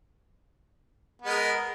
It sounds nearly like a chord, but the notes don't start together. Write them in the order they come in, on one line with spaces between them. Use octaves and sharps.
B3 G#3 A#4